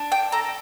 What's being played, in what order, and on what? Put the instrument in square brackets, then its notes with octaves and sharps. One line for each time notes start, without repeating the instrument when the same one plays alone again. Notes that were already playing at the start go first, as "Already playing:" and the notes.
Already playing: [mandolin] D4
G5
A4 A#5